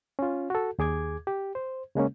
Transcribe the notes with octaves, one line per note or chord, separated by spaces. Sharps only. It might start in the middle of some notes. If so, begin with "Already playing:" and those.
C#4 F4
F#4 A4
D#2 G#4 D6 G#6
G4
C5
C#3 G#3 A#3 C#4